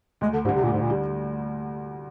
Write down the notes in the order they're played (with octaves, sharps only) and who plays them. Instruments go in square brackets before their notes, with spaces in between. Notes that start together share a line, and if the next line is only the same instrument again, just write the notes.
[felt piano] D2 [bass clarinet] G#3
[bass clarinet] D3
[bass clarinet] G#2 [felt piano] D3 G3
[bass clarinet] C3
[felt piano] D2 [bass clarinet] A#2
[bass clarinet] G#2
A#2
[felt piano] D3 G3